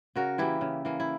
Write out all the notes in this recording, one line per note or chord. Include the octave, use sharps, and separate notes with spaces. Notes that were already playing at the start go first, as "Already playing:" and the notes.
C#3 F#4 A#4
E3 A#3 E4 G4
C#3
E3 A#3
E4